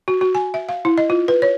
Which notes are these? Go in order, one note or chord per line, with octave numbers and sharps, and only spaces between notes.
F#4
F#4
G#5
E5
F5
E4
D#5
F4
B4
C#5